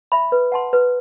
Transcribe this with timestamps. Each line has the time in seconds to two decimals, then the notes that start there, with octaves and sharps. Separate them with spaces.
0.12 E5 B5
0.32 B4
0.52 F#5 A5 C6
0.73 B4